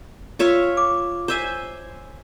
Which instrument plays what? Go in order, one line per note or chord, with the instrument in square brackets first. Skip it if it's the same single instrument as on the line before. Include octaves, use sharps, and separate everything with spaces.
[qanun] F4 C#5 E5
[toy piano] D6
[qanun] C5 E5 G#5